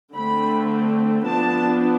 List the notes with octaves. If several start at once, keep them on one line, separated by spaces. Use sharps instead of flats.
D3 A3 C4 B5
F3 B3 D4 A5